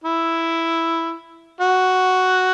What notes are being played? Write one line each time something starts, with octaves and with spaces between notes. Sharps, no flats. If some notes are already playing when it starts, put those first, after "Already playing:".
E4
F#4